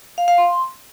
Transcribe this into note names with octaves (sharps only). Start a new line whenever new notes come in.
F5
F5
C6